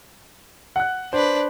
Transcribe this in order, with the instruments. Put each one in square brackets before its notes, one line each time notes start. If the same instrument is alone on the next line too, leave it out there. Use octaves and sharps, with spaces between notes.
[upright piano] F#5 F#6
[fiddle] D4 B4 [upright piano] C5